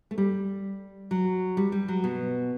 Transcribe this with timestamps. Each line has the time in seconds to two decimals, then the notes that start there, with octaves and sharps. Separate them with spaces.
0.11 A3
0.18 G3
1.11 F#3
1.57 G3
1.72 G3
1.88 F#3
2.04 B2